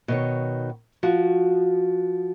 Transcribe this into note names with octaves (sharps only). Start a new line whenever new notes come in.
B2 D#3 C#5
F3 F#4